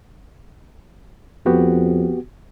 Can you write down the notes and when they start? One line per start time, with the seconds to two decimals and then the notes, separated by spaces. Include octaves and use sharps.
1.46 F2 B3 F#4 G4